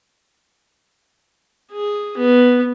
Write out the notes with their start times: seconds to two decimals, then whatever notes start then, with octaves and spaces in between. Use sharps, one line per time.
1.72 G#4
2.17 B3